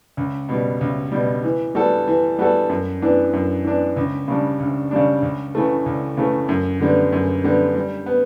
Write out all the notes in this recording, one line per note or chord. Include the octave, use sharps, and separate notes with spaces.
C#2
B2 G3
C#2
B2 G3
E3
G3 B3 F#4 A4
E3
G3 B3 F#4 A4
F#2
E3 B3 D4
F#2
E3 B3 D4
C#2
C#3 G3 D4
C#2
C#3 G3 D4
C#2
C#3 E3 A3
C#2
C#3 E3 A3
F#2
D3 G3 B3
F#2
D3 G3 B3
G3
B3